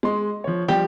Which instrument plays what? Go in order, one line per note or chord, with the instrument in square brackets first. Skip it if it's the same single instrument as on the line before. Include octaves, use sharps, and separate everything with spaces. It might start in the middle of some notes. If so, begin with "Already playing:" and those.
[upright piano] G#3 C6
F3 C#5
[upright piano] F3 G3 [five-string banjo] G4